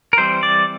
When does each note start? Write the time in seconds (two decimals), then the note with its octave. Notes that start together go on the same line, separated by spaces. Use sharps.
0.13 A#4
0.17 E3 G3 C4 C5
0.43 D5